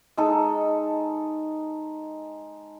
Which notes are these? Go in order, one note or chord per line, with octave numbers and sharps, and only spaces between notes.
G#3 D#4 A4